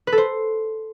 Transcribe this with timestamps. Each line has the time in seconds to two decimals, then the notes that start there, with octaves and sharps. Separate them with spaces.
0.07 B4
0.12 A4
0.18 C5